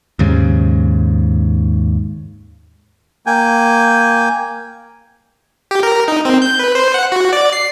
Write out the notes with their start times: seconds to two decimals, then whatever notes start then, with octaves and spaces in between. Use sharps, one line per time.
0.19 D#2 G#2 C#3
3.26 A#3 G5 G#5
5.71 G4
5.83 A#4
6.08 D#4
6.25 C4
6.42 G6
6.59 B4
6.75 C5
6.94 F#5
7.12 F#4
7.33 D5
7.53 C7